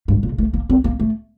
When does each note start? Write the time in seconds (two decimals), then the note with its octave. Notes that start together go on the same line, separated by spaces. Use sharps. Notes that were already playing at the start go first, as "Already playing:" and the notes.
0.08 G2
0.23 A#2
0.38 A3
0.53 A#3
0.70 C4
0.84 A#3
1.00 A3